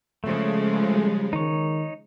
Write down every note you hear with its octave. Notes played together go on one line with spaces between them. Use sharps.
C#3 F3 G#3 A3
G3
D#3 D#4 C#5